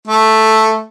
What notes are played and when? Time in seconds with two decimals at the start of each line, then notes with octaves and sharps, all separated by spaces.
0.08 A3